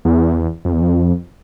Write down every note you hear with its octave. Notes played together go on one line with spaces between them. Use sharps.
E2
F2
E2
F2